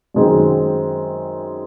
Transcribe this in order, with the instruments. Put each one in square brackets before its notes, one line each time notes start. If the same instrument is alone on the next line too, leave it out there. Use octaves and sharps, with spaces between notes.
[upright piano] F#2 D#3 G#3 C4